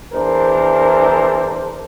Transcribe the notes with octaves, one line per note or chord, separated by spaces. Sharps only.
E2 D4 A#4 C5